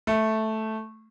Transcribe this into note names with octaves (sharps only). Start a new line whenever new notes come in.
A3